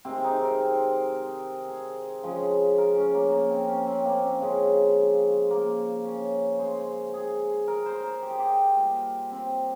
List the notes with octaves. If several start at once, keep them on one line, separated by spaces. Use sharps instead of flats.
C3 D#3 G#3 C4
D#4
A#4
C5
A#4
G#4
C#3 F3 G#3
A#4
C#4
A#3
A#3
C4
C#4
C4
A#3
C#4
C#3 F3 G#3
A#3
C#4
C#3 G#3 C5
G#4
A#4
C5
A#4
G4
G#4
G4
A#2 G3
C4